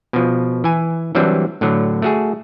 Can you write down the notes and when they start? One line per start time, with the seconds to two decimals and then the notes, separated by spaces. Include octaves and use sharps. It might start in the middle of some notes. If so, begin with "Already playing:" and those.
0.13 B2 F3
0.64 E3 G#5
1.15 E3 F#3 G3 C4 D4
1.61 A2 D3 F#3
2.02 A3 F#4 G#4